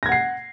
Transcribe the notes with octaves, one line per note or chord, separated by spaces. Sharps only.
F#5 G#6 A#6 C7